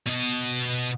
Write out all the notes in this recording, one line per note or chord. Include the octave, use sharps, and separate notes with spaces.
B2 D#5